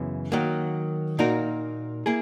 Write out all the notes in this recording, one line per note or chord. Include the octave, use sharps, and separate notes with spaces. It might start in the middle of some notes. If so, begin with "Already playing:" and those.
Already playing: F#2 C#3 E3 B3
D#3 F#3 A#3
A#2 A#3 D#4 F#4 A#4
A#3 E4 G#4